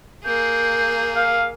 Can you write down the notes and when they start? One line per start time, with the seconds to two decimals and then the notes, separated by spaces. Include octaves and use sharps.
0.25 A#3 G#4 G6
1.16 F5